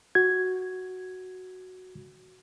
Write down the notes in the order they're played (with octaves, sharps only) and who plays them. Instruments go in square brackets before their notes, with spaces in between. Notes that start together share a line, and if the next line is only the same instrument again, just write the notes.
[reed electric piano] F#4 G#6